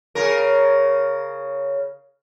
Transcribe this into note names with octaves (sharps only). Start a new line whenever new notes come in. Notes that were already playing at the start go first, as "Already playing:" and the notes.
C#3 A#4